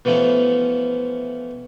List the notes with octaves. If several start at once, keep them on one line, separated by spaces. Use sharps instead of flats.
B2 E3 F3 A3 C#4